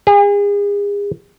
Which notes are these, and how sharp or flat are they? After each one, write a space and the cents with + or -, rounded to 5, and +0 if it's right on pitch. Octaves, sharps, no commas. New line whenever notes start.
G#4 -40